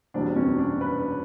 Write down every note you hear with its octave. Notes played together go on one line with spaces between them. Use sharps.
F#1 E2 B2 G3 D4
C#4
D4
B4